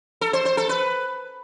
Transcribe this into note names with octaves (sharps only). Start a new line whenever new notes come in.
A4
C5
C5
A4
B4